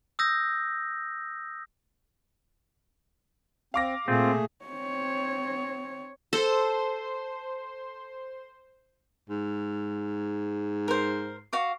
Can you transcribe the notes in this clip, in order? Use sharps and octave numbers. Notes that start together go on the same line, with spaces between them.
D#6 E6 G6 A#6
C4 F5 D6 A#6
A#2 A3 C4 F4 G#4
C4 C#5
A4 C5 C6
G#2
A#4 C5
F#4 F5 D6